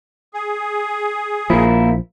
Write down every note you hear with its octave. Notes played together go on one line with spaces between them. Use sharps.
G#4
A#1 A#2 F3 A#3 E4